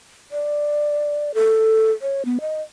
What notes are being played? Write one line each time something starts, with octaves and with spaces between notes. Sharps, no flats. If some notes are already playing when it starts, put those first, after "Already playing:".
D5
A4
C#5
B3
D#5